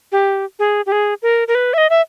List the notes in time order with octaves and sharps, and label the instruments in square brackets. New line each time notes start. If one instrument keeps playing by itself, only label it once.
[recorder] G4
G#4
G4
G#4
A#4
A#4
B4
E5
D#5
E5